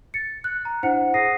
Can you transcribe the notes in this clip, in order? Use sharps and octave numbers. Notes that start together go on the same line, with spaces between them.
A6 C#7
F#6
A#5
D4 E4 C5 F#5 C#7
G#4 D#6 A#6 C7 D#7